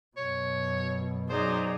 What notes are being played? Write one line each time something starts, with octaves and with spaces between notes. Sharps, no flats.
F#2 B2 C#5
F#3 D#4 G#4 C5 D5